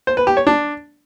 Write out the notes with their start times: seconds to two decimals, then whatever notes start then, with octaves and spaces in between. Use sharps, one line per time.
0.07 C5
0.17 B4
0.27 G4
0.37 C#5
0.47 D4